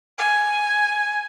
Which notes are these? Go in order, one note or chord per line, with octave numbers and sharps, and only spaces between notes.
G#5